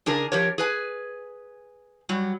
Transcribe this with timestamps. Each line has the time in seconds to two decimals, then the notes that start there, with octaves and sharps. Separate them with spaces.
0.06 C#3 D4 G#4 A#4
0.32 F3 G4 A#4 C#5
0.58 G#4 B4 G#5
2.09 F#3 G3